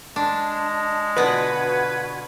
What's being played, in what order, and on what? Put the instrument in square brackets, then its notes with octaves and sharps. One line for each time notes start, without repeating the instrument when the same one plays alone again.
[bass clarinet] G#3 [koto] D4 [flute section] A5
[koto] B2 D3 B3 [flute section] F4 F#4 G#6 [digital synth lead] B4